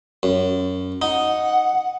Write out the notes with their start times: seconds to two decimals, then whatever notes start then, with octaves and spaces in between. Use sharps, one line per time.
0.23 F#2
1.02 D#4 F#5